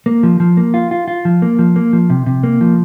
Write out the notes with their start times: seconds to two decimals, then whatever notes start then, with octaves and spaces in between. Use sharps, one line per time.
0.06 A#3
0.23 F3
0.40 F3
0.57 A#3
0.74 F4
0.91 F4
1.08 F4
1.25 F3
1.42 A#3
1.59 F3
1.76 A#3
1.93 F3
2.10 C3
2.26 C3
2.43 A#3
2.61 F3